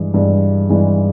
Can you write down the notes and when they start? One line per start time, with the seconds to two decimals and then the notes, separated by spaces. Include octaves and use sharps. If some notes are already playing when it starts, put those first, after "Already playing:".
Already playing: G2 E3 G#3
0.14 G2 E3 G#3
0.69 G2 E3 G#3